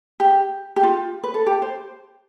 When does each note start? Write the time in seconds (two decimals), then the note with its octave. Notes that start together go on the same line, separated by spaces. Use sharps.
0.20 G4
0.76 G4
0.83 F4
1.23 B4
1.34 A4
1.46 G4
1.62 C5